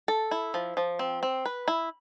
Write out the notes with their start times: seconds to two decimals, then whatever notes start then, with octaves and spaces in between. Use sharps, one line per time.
0.08 A4
0.31 E4
0.54 F3
0.77 F3
0.99 C4
1.23 C4
1.46 B4
1.68 E4